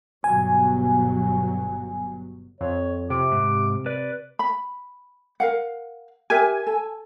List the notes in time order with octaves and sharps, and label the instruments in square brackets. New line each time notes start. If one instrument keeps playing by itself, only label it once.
[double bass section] G1 B2 F#3 [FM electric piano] G#5
[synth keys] F2 [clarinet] C#5
[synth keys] C3 [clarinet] D6
[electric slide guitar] G#2
B4 D5
[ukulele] B5
A#4 F5 F#5
[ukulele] G4 A#4 E5 [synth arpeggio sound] G#5
[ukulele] A4